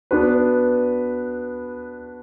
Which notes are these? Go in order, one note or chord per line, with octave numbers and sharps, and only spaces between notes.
B3 D4 F#4 B4